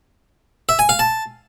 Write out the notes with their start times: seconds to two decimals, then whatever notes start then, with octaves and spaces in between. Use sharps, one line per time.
0.69 E5
0.79 G#5
0.89 F5
0.99 A5